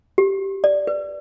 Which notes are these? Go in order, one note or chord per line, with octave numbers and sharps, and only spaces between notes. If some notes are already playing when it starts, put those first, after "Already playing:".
G4
D5
B4